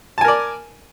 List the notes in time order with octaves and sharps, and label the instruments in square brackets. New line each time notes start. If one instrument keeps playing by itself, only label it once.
[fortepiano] A5
G#5
A#4
D5